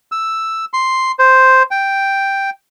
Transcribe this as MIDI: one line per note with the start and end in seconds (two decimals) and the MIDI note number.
0.12 0.65 88
0.73 1.12 84
1.19 1.63 72
1.71 2.50 79